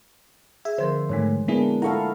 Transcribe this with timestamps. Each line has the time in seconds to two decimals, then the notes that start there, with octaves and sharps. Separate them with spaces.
0.65 G#4 E5
0.78 D3 F3 A#4 C5
1.09 G#2 D#3 G#3 A3 C#5
1.48 G#3 A#3 B3 D4 E4 G#4
1.82 E4 A4 F5 F#5 A5 A#5 C#6